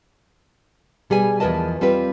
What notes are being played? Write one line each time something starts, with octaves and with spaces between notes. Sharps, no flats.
B2 G3 G#4 G#5
E2 F3 A#4 B4 D#5 A5
G3 C4 F4 B4